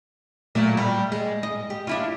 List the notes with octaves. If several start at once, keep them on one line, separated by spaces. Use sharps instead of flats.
A#2 F#3 A3
G3
G#3
D#5
G4
D4 E4 F4